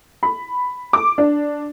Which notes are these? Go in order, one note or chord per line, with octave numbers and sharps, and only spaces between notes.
B5
D6
D4